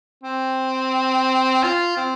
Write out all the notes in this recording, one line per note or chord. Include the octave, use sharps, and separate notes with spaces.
C4
F4
C4